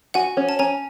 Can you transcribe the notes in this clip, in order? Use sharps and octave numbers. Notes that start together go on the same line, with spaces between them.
F#4 F#5 G#5
C#4
A5
C#4 G#5 A#5